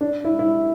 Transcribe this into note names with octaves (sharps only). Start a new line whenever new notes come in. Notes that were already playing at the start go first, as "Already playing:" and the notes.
D4
E4
E4